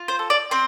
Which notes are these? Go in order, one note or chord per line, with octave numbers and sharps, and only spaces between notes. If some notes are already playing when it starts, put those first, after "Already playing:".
Already playing: F4
C5
A4
D5
C4 C5